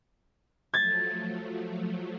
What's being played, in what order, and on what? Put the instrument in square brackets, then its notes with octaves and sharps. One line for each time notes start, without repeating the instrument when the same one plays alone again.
[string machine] F3 F#3 A3 [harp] G#6 A6